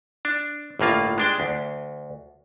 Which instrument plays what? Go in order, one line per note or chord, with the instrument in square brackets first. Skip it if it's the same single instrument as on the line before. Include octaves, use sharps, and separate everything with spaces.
[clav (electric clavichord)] D4
G1 A2 A#3 F4
G#3 D4 G5
D2